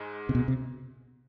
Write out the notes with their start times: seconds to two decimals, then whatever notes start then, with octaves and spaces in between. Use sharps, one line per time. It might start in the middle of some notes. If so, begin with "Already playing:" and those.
Already playing: G#2 G#3
0.29 C3
0.35 B2
0.48 C3